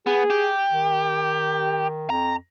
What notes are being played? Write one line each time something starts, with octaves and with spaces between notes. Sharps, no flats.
B3 G#4
G4
D#3
F2 A#5